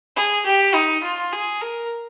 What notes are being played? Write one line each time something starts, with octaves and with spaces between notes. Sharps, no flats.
G#4
G4
D#4
F4
G#4
A#4